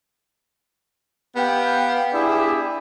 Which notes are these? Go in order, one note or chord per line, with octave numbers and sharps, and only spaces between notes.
B3 G4 F5 G5
D4 E4 G4 G#4 D5 E5